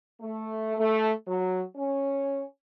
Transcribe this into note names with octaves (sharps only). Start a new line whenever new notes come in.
A3
A3
F#3
C#4